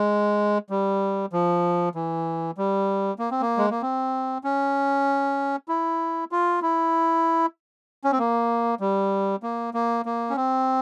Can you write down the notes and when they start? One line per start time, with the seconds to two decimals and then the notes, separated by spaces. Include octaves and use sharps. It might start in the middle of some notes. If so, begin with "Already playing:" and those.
Already playing: G#3
0.70 G3
1.33 F3
1.95 E3
2.58 G3
3.19 A#3
3.31 C4
3.41 A#3
3.58 G#3
3.70 A#3
3.82 C4
4.44 C#4
5.68 E4
6.32 F4
6.62 E4
8.04 C#4
8.12 C4
8.19 A#3
8.80 G3
9.43 A#3
9.74 A#3
10.05 A#3
10.30 C#4
10.36 C4